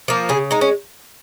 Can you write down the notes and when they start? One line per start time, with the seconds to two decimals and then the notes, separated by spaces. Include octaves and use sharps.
0.08 F3 A#3
0.29 C#3 G#4
0.51 G#3 D#4
0.61 C#4